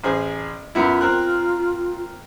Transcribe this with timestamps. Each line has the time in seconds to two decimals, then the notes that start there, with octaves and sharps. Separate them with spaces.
0.04 A1 G#4 C5
0.75 F#2 B3 E4 F4
1.01 C4 A#4 F#6